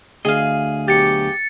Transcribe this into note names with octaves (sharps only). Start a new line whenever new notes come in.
D2 G#4 D#5 F5
B2 F#3 G4 A6 C#7